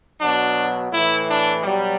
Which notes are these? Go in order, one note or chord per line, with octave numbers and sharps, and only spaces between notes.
B2 F#3 D4
A2 E3 E4
D4
B2 F#3 G3